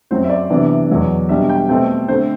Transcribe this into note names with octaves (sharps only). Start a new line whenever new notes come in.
F#2 F#3 C4 C5
E5
D5
C3 E3 B3 D4
E2 B2 F#3 B3
B2 G3 D4 E5
G5
B2 A3 C4 G5
D3 A3 C4 C5